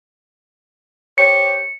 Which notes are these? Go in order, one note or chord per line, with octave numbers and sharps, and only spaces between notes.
G4 C5 C#5 C#7